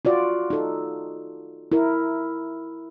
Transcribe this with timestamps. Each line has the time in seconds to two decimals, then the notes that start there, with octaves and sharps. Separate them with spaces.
0.05 F4 F#4 D5
0.50 D#4 A4
1.72 E4 A#4